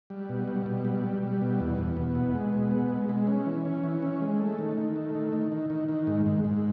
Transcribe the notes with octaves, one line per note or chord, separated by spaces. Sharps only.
G3
B2
G3
B2
G3
G3
G3
B2
E2
E2
B3
B2
G#3
B2
B3
G#3
G#3
C#4
E3
C#4
E3
C#4
G#3
A3
D#3
D#3
A3
D#3
D#3
D#3
D#3
D#3
G#2
G#2
G#2